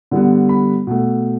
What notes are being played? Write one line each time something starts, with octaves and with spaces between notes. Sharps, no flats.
D3 G3 B3
B5
B2 A3